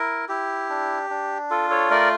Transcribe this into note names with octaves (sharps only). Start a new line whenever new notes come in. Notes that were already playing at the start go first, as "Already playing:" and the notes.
Already playing: E4 A#4
E4 G4
D4
D4
F4 A4
A4 C#5
A3 A#4 D5